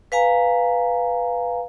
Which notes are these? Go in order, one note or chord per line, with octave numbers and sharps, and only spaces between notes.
B4 F5 G#5 A#5